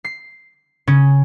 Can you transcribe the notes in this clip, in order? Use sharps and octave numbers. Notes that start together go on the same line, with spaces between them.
C7
C#3 C#4